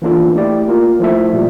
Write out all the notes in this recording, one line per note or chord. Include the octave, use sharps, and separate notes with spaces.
E3 A#3 D4 F4 A4
A3 E4 G4 D5
A#3 F4 A#4
F3 A3 E4 A4 E5
A#2 G3